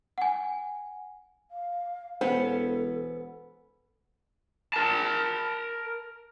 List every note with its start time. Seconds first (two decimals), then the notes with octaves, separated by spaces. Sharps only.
0.18 F#5 G#5
1.51 F5
2.21 E1 B3 C#4 A4 C5
4.73 A#4 A5